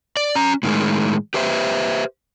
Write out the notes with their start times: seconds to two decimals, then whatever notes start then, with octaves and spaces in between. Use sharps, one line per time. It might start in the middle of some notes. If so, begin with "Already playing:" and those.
0.17 D5
0.35 C#4 A#5
0.63 A2 D#3 E3 G#3
1.34 G4 B4 C5 E5